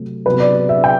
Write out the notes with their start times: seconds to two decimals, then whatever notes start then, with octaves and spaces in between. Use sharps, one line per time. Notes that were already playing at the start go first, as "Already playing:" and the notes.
Already playing: C3 F#3 A3 C4
0.26 C3 F#3 B3 B4
0.40 D5
0.69 E5
0.84 G5